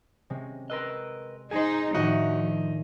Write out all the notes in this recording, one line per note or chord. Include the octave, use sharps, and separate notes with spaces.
C3 G#3 C#4
A#4 B4 D#5 C6 E6 F#6
D#4 G#4 C5
D#2 A2 F3 D4 D#4 F#4